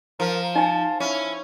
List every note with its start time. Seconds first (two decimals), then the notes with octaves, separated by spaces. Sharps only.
0.20 F3 A#4
0.56 D#4 G#5 A5
1.00 C#4 E4